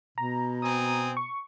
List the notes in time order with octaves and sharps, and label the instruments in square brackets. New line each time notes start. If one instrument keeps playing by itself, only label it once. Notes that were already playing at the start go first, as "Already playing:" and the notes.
[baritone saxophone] B2 [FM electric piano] A#5
[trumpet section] C4 G#5 D#6
[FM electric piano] C#6